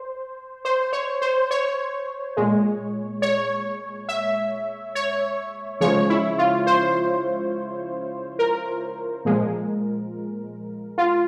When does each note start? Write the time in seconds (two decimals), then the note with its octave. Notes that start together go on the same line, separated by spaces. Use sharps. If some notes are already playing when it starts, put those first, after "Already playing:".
Already playing: C5
0.65 C5
0.93 C#5
1.22 C5
1.51 C#5
2.37 A#2 G#3
3.22 C#5
4.09 E5
4.95 C#5
5.81 C#3 F3 G#3 C#5
6.10 E4
6.38 F4
6.67 C5
8.39 A#4
9.25 A#2 F3 G#3
10.98 F4